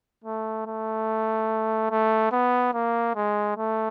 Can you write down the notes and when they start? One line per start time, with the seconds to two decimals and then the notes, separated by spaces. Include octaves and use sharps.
0.24 A3
0.67 A3
1.91 A3
2.32 B3
2.74 A#3
3.15 G#3
3.57 A3